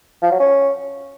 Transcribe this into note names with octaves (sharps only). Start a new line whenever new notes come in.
F3
F#3
C#4